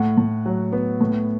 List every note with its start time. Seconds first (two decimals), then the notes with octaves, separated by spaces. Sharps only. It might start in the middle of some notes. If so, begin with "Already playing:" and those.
Already playing: A2 F#5
0.18 A2
0.46 F#3
0.72 B3
1.01 A2